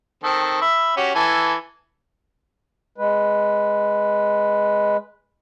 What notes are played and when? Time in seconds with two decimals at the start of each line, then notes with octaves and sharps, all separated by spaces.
0.23 D#3 C4 A4
0.61 E5 B5
0.97 C#4 F#4 G4
1.15 E3 A4 G#5
2.98 G#3 B4